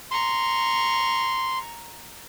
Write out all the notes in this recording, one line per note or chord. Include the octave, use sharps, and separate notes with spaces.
A#5 C6 C#6